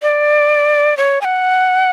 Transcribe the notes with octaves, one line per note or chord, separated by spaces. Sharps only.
D5
C#5
G#5
F#5